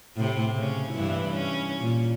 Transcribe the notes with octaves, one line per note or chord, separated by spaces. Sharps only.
A2 C3
C#3 C#4
G2 E3 E4
C#4
A#2